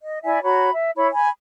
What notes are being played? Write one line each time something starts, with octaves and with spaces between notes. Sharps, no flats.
D#5
E4 D5 E5 G#5
F#4 C#5 A#5 B5
E5
E4 C#5 B5
G#5 B5